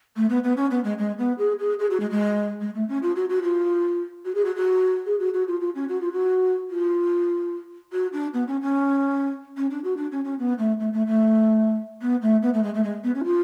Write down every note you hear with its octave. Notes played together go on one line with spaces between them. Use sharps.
A3
B3
B3
C#4
B3
G#3
G#3
B3
G#4
G#4
G#4
F#4
G#3
G#3
G#3
A3
C#4
F4
F#4
F#4
F4
F#4
G#4
F#4
F#4
G#4
F#4
F#4
F4
F4
C#4
F#4
F4
F#4
F4
F#4
D4
B3
C#4
C#4
C#4
D4
F#4
D4
C#4
C#4
B3
A3
A3
A3
A3
B3
A3
B3
A3
G#3
A3
G#3
B3
C#4
F4